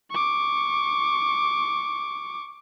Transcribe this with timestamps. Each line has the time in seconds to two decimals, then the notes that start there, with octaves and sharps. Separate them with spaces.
0.11 C#6 D6